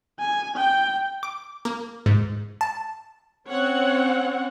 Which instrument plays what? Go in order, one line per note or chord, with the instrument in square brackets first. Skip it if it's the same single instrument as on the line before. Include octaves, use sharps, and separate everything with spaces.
[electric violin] G#5
G5
[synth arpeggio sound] D6
A#3
G#2
A5
[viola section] C4 C#4 C#5 F#5